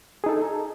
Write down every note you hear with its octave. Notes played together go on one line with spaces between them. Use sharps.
D#4 G#4 A4